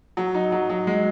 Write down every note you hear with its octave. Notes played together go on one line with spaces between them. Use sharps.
F#3
D#4
F#3
F#3
G#3